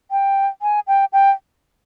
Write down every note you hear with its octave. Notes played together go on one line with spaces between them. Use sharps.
G5
G#5
G5
G5